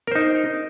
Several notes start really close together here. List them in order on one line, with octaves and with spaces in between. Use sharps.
A#4 C5 D#4